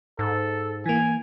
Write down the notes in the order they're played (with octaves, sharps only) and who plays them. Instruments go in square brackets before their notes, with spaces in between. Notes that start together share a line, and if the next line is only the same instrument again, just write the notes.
[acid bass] G#2 [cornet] A4
[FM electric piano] E3 A#3 [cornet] G#5